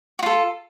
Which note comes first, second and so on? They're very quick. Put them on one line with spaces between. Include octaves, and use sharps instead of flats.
F#4 F4 A4